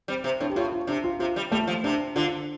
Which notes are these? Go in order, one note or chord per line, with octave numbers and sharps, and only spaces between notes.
G3 C4
C3 C4
A2 D4
G4
A2 F4
F4
C3 D4
F4
C3 F4
G3
G3 A3
F3
C3 D4
D3 F4